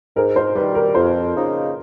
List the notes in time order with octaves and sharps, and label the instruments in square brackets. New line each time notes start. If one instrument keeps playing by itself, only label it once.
[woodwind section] G#2 [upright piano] A#4
[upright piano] C5
[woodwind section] D#3 G3 [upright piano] B4
[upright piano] A#4
[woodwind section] F2 [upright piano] C5
[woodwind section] C#3 F3 A#3 D#4